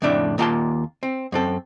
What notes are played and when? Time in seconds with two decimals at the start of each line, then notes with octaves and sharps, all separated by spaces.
0.02 F2 A2 C#3 D4 D5 E5
0.38 D#2 A#3 F4 G5 A5 C6
1.03 C4
1.32 F#2 C4 A4